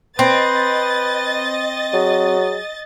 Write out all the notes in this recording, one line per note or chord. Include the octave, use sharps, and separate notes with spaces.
C4 B4 D#5 A6
F#3 G#4